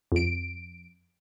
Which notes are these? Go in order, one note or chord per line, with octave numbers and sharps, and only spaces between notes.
F2 D7